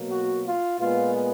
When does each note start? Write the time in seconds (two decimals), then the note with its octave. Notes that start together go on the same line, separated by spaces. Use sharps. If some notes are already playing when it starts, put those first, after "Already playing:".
Already playing: B2 F#3 A#3
0.09 F#4
0.44 F4
0.79 A#2 G#3 B3 F4